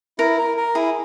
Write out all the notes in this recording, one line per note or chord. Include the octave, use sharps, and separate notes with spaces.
E4 A#4
A#4
A#4
E4 G#4